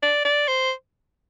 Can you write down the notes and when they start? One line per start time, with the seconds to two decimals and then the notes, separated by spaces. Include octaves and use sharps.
0.03 D5
0.25 D5
0.48 C5